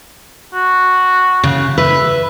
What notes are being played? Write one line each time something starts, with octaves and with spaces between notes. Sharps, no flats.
F#4
C#3
B4 E5